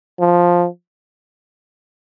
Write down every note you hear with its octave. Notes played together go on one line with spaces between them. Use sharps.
F3